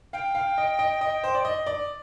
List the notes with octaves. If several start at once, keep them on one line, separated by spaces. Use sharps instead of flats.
F5 G5
F5
D#5
D#5
D#5
C5
D5
D#5
D5